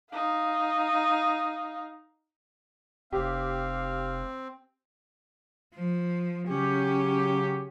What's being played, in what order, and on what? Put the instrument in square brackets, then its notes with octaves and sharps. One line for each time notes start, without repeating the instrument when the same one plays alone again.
[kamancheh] D#4 F5
[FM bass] F1 [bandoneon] C4 [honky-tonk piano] G4 [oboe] F5
[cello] F3
[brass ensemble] C#3 F#3 G4 [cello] C#4